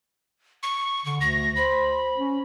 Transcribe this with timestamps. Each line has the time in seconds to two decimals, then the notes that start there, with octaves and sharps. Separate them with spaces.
0.63 C#6
1.06 D3 C#6
1.21 D2 A#6
1.56 C5 B5
2.17 C#4